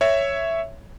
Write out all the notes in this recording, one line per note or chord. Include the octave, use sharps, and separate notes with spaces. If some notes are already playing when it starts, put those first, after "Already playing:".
C#5 E5